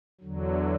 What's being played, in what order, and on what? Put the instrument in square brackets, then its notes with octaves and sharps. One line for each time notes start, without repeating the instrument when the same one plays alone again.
[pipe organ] E2 D3 F#3